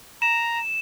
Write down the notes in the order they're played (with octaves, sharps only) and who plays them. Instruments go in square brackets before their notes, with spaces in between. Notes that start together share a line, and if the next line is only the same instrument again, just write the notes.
[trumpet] A#5 [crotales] E7